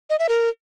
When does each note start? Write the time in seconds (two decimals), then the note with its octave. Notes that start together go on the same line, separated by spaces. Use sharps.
0.10 D#5
0.19 E5
0.29 A#4